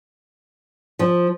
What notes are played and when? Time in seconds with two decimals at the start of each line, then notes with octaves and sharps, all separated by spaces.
0.99 F3